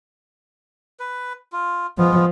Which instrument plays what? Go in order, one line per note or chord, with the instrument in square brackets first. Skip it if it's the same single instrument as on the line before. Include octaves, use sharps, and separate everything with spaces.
[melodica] B4
F4
[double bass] F3 [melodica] G#3 B3 F4